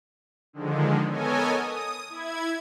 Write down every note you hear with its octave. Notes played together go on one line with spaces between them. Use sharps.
D3 D#3 F3 G#3
B3 A4 A#4 C#5 D#5 G#5
D#6
E4 G#6